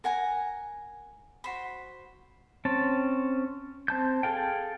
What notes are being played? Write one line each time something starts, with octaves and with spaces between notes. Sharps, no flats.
A#4 F#5 G#5 A#5
F#4 C5 B5
C4 C#4 A5
C4 A5 G6
G#4 A4 F5 G5